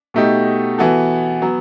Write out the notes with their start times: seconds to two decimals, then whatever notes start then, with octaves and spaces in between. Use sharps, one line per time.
0.14 B2 A3 D#4 G4
0.78 E3 B3 F#4 A4
1.42 F#3 B3